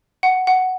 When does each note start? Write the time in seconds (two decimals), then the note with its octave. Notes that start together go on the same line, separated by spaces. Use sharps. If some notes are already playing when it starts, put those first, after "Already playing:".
0.23 F#5
0.47 F#5